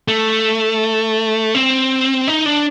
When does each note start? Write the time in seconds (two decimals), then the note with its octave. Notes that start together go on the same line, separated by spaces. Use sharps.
0.08 A3
1.55 C4
2.28 D#4
2.46 D4